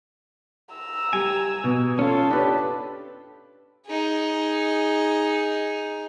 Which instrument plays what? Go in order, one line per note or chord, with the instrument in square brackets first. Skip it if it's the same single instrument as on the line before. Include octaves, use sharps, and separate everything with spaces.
[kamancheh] A#5 E6
[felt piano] G3 [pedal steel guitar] G#5
[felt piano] B2
[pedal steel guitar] C#4 F4 [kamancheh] A4
[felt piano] D4 B4 C#5 [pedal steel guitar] G4
[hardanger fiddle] D#4 G#4